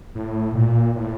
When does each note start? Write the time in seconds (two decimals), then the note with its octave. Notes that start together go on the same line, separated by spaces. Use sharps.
0.15 A2
0.55 A#2
0.96 A2